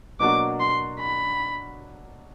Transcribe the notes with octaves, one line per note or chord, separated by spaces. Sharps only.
B2 F#3 A#3 D4 F#4 D6
C6
B5